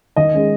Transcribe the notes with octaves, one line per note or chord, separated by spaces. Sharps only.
D#3 D#5
G#3 C#4